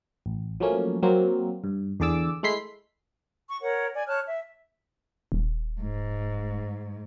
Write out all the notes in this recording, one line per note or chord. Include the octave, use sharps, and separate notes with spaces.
A1
F3 F#3 A3 A#3 C#4
F#3 A#3 C4
G2
E2 D3 G#4 D5 D6 E6
G#3 A3 E4 C6 B6 C7
C#6
A#4 C#5 F#5
D5 G#5
C#5 A5 F6 F#6
E5
D#1
G#2